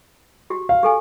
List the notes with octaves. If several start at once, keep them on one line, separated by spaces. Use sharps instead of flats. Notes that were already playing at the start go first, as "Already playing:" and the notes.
F#4 G4
F5
G4 A4 G#5